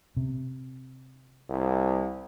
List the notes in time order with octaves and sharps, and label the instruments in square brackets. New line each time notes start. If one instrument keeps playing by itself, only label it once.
[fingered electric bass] C3
[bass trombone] C2